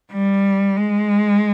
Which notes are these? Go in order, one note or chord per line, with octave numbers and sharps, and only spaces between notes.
G3
G#3